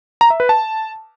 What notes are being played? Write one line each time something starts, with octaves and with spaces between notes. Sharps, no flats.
A#5
E5
B4
A5